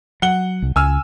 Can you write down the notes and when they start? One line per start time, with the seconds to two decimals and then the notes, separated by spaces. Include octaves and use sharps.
0.22 F#3 F#5 G7
0.62 C2
0.76 C#2 G#5 E6 F6